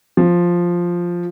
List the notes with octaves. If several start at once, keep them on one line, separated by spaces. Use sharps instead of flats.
F3